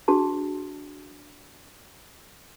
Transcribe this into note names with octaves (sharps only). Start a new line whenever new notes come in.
D4 F#4 G#4 A5